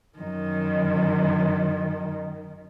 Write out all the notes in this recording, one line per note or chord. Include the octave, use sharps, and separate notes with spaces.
F#2 D#3